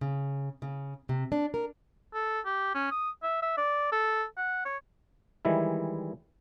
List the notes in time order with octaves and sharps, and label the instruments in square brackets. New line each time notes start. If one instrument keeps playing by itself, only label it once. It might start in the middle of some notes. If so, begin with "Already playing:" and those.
[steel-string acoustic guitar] C#3
C#3
C3
D4
A#4
[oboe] A4
G4
C#4
D#6
E5
E5
D5
A4
F#5
C#5
[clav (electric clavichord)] D#3 E3 G3 G#3 E4